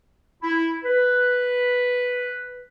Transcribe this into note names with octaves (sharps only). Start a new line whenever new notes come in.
E4
B4